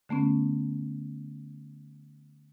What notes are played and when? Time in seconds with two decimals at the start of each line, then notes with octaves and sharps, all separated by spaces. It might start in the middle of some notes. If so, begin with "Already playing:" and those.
0.09 D3 A3 B3 C#4